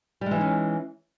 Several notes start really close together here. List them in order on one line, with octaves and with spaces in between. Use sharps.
G3 G#3 E3 D#4 C#4